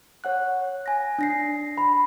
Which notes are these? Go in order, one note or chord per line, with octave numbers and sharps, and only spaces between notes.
C#5 F#5 F#6
G#5 A#6
D4 A#6 C7
B5